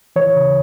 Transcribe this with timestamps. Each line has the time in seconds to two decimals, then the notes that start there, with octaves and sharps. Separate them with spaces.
0.16 E3 C#5
0.36 C#3